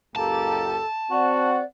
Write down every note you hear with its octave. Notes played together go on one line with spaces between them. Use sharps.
C#2 F#2 A#3 G4 A4 A5
C4 F#4 D5 F#5